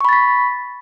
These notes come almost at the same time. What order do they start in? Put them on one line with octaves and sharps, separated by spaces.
C#6 B5 A6 B6